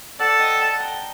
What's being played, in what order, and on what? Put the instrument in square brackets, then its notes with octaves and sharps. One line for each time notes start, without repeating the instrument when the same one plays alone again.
[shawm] A4 [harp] D5 F#5
[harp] D#5 G5
F#5 A5
G5 A#5